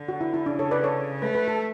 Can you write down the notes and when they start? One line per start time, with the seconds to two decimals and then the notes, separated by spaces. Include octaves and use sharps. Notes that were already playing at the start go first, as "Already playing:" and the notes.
Already playing: D3
0.09 F#4
0.21 E4
0.34 E4
0.46 C#3 D4
0.59 A4 C#5
0.71 B4 D5
0.84 A4 C#5
1.22 A3 B4
1.35 B4
1.48 A4